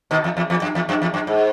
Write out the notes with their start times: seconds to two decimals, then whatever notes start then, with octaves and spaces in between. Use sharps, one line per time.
0.11 B2 D#3
0.24 E2
0.37 E2
0.50 E2
0.62 F#2
0.75 E2
0.89 F#2
1.02 E2
1.14 F#2
1.27 G#2